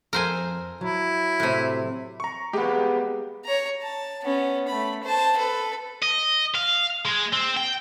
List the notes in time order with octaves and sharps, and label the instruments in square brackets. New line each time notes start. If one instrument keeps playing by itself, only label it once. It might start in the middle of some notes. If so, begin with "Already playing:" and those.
[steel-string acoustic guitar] F2 [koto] A#4 C5 G#5
[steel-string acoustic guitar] F#3 [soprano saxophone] E4
[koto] A2 C3
[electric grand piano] A#5 C#6
[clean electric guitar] G#3 B3 [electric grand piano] G4
[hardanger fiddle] C#5 A#5
A5
B3 C#4
A3 B5
C5 A5
A4 B4
[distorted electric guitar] D#5
F5
G#3
C4
G5